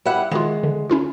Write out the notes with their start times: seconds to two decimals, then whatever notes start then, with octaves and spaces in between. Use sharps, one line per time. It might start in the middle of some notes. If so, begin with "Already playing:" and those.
0.05 G3 E4 F#5
0.31 D#3 G#3 F4
0.63 D3
0.90 C#4 E4 F4